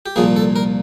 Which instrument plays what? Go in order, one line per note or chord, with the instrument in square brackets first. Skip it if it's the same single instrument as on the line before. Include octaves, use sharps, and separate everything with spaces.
[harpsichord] G4
C2 A#2 F3 A#3 G#4
A4
A#4